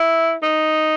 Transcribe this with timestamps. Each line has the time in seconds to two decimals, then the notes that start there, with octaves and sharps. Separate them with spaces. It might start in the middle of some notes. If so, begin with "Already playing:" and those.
Already playing: E4
0.43 D#4